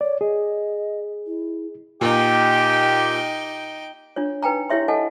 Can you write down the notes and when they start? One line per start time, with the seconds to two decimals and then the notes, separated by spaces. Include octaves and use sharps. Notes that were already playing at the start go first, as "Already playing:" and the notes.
0.01 C#5 D5
0.21 G#4 D#5
1.26 E4
2.01 A#2 D#4 G4 G5
4.16 D4 F4 C#5
4.43 D#4 B4 G5 G#5 A#5
4.70 E4 G4 C#5 E5 C6
4.88 A4 D#5 F#5 G#5 A5